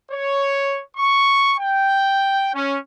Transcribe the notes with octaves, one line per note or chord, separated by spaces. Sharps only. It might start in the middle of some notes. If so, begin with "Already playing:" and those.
C#5
C#6
G5
C#4